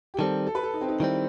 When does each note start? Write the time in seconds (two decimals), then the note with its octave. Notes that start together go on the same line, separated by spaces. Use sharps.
0.14 G4
0.18 D#3 G3 C4 A4
0.47 A4
0.55 B4
0.63 A4
0.74 D#4
0.81 C4
0.88 D#4
1.00 D#3 G3 C4 E4